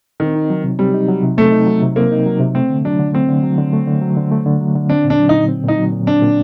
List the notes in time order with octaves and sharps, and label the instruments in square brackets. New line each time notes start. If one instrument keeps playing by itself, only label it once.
[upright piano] D#3 [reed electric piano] C4
[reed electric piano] D#4
F#3
C3
[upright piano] G3 [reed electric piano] C4
[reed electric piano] D#4
F#3
C3
[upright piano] A3 [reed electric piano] C4
[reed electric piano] D#4
F#3
C3
[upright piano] A#3 [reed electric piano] C4
[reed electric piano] D#4
F#3
C3
[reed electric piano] A3 [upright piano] C4
[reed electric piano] D3
[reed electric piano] F#3 [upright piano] D4
[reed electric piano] D3
[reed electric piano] A3 [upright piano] C4
[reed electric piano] D3
F#3
D3
A3
D3
F#3
D3
A3
D3
F#3
D3
[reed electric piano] C4 [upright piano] D4
[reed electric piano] A#2
[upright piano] D4
[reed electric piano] F#3
[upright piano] D#4
[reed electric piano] A#2
C4
[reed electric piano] A#2 [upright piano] D#4
[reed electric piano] F#3
A#2
[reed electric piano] C4 [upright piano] D4
[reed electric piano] A#2